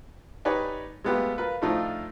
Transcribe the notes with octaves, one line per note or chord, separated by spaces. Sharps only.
D#4 G4 B4 C#5 D5 G#5
G#3 A3 B3 F4 G4
F4 A#4 B4
A2 F3 A3 D4 D#4 F4